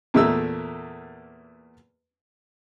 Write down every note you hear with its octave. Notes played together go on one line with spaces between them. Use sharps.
E2 A#2 A3 A#4 E6